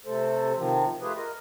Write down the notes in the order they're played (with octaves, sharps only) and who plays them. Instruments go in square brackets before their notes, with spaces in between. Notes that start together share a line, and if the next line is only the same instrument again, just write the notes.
[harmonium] C3 A3 A4 C5
C3 D#3 F3
A3 F4 G4 G#4 B4
A#4 D#5